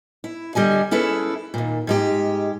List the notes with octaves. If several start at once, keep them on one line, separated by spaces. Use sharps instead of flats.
E4
D3 G3 D#5 G#5
C#4 E4 G#4 A4 B4
D#2 A#2
G#2 G#3 G4